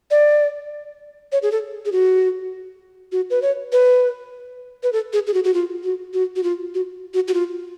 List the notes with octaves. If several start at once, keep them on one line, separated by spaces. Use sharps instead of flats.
D5
C#5
G#4
A4
G#4
F#4
F#4
B4
C#5
B4
B4
A4
G#4
G#4
F#4
F#4
F4
F#4
F#4
F#4
F4
F#4
F#4
F#4
F4